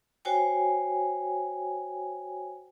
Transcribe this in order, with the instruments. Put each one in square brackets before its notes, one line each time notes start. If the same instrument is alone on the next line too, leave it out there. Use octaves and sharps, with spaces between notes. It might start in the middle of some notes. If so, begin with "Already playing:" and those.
[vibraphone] F#4 C5 C#5 G5 G#5